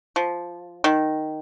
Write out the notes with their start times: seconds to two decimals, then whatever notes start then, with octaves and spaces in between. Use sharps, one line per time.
0.16 F3
0.84 D#3